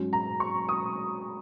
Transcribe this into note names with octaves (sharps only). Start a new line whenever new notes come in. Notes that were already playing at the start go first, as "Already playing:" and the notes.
Already playing: G#2 F#3 C#4
A#5
C#6
D#6